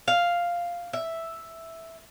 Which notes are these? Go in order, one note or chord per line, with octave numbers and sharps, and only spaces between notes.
F5
E5